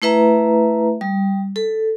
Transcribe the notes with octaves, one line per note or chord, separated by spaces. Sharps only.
A3 E4 B4 E5 A#5
G3
A4